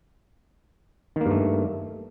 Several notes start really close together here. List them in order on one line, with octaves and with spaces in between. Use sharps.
D#3 A#3 G2 A3